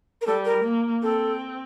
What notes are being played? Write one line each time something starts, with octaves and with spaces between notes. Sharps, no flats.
A#4
G3 A4
A#4
A#3
C4 A4